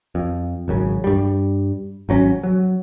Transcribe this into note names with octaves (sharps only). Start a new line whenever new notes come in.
F2
G#1 F#2 C#3
G2 G3
G#1 F#3 C4 C#4
F#3